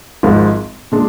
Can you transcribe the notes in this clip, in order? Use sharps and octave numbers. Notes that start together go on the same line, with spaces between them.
G#1 G#2 F3 G#3
A#2 G#3 D4